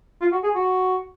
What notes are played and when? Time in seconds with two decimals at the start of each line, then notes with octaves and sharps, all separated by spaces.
0.21 F4
0.32 F#4
0.44 G#4
0.55 F#4